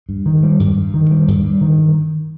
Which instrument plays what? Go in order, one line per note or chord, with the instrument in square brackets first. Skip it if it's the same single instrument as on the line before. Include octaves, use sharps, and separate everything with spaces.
[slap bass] G2
D#3
G3
G2
G2
D#3
G3
G2
G2
D#3